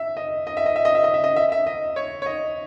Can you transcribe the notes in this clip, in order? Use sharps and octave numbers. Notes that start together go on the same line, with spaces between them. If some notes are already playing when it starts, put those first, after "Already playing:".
Already playing: E5
D#5
D#5
E5
D#5
E5
D#5
E5
D#5
E5
D#5
E5
E5
D#5
C#5
C#5
D#5